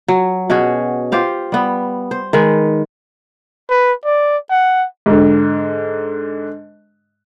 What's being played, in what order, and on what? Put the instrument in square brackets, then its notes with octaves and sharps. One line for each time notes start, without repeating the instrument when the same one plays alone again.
[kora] F#3
B2 C#4 F#4 G#4
F4 G4 C5 F5
G3 B3
C5
D#3 G#3 B4
[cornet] B4
D5
F#5
[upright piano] G#2 D3